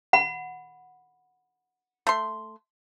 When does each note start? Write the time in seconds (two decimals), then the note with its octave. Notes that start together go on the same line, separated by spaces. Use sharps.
0.13 F#5 B5
2.07 A3 C6